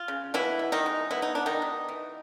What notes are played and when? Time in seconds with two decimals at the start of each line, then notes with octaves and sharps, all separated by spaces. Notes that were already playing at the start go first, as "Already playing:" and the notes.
Already playing: F4
0.08 C#3
0.34 B2 E3 E4
0.59 B2
0.72 D#3 D#4
0.86 G#3
1.11 B3 E4
1.22 D#4
1.35 B3 D4
1.46 D#3 D#4
1.62 B2
1.89 E3